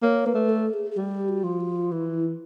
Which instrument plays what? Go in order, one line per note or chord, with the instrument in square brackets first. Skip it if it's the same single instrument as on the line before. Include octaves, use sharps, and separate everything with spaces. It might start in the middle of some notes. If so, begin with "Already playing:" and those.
[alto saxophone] A#3 [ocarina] C#5
[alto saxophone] A#3 [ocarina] B4
[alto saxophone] A3
[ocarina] A4
G#4
G#4
[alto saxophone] G3 [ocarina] G4
[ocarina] F#4
[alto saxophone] F3
[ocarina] F4
[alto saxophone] E3 [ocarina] E4